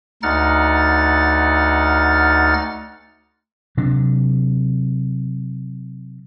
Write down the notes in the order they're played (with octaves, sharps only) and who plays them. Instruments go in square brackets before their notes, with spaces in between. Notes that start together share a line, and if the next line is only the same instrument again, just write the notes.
[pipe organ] D2 D#4 F#5 F6 A6
[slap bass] C3 F#3 D4